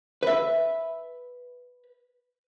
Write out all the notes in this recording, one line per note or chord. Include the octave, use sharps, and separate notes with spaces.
B4 E5